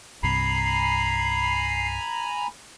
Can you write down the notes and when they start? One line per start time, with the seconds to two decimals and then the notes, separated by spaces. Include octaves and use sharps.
0.23 C2 G2 C3 G#5 A#5 B5 C7